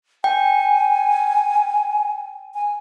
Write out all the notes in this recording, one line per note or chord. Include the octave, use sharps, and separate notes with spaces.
G5 G#5
G#5